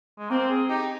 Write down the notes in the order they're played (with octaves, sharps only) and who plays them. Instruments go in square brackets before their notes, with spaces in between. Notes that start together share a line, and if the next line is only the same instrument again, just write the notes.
[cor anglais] G#3
[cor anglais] A#3 [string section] C4
[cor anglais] G#4
[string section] D#4 [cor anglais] G4